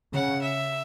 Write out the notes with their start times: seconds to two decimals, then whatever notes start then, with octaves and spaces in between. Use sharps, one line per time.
0.13 C#3 F#5
0.41 E5